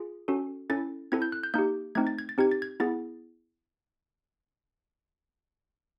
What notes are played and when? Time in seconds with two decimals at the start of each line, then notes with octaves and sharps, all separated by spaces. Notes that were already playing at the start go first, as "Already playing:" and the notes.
Already playing: F4 G#4
0.28 C#4 F#4 A4
0.70 C#4 E4 A4 A6
1.12 C4 E4 A4 G#6
1.22 G6
1.32 F#6
1.43 G6
1.54 A#3 D#4 G4 G6
1.95 A3 C4 D#4 G#6
2.07 A6
2.19 G#6
2.29 A6
2.38 C4 D#4 G4 G#6
2.52 A6
2.62 G#6
2.80 B3 E4 G#4 A6